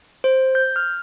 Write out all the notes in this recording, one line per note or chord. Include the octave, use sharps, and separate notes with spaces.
C5
G6
F6